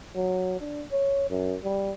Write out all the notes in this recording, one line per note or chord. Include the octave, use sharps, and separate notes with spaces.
F#3
D4
C#5
F#2
G3